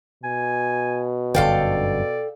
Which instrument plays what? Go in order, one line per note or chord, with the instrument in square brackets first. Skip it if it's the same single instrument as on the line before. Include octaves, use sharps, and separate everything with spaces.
[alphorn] B2 [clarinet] G#5
[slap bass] G1 F#2 D3 [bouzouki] A4 F5 G5 [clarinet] D5